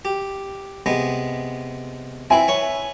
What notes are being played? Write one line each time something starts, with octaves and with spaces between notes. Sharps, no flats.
G4
C3 G#3 B3
C4 E4 B4 E5 G#5
B4 C#5 C#6